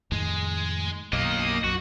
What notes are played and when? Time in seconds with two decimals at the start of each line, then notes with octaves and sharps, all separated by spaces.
0.12 F2 A2 D#3 G#3
1.13 B1 F#2 B2 A#3 D#4 D#5
1.64 B1 F#2 F#4